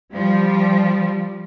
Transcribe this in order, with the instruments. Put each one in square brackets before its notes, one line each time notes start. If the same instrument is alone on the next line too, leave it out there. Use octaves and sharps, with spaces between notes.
[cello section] F3 G3